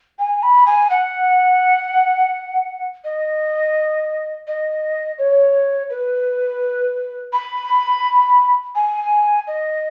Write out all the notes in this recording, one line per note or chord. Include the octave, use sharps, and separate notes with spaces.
G#5
B5
G#5
F#5
D#5
D#5
C#5
B4
B5
G#5
D#5